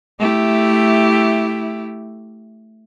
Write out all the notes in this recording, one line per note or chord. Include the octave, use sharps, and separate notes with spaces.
A3 E4 G4